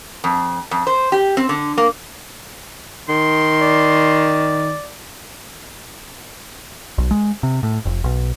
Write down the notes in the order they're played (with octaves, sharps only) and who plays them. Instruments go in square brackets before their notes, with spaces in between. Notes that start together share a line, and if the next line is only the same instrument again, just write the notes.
[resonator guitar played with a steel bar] F2
F2
C5
G4
C4
D3
A#3
[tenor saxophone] D#3 [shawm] C6
[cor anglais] D5
[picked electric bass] B1
G#3
C3
A2
F1
B1